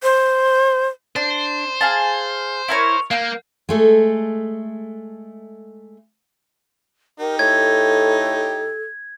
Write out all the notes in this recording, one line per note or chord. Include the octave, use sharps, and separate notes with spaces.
C5
D4 C5
G#4 F5 A5
E4 A#4 C#5
A#3 F5 G6
G#3 A3 A4
D#4 G4 A#4
A2 A4 G#6